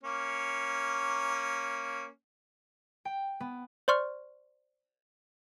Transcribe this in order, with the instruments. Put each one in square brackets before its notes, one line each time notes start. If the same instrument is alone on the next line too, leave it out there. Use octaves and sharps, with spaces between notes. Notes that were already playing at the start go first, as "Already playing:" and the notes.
[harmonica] A#3 C#4
[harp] G5
B3
[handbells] C5 D5 C6 C#6 F6